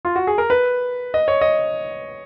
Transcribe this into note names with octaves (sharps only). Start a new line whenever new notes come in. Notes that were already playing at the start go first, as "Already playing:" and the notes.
F4
F#4
G#4
A#4
B4
D#5
C#5
D#5